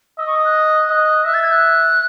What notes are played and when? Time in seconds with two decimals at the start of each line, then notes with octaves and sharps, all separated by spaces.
0.18 D#5 E6
0.27 C#6
0.36 D#6
0.45 F#6
0.90 D#5
1.25 E5 F#6
1.34 A6
1.42 G#6
1.51 F#6